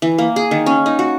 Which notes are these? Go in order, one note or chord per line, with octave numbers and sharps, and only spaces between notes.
E3
A#3
G#4
D#3
C#4
D#4
F#4